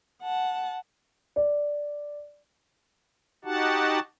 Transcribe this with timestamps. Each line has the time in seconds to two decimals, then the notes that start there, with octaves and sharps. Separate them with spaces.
0.22 F#5 A5
1.36 D5
3.45 D#4 F#4 G4 F#5 A5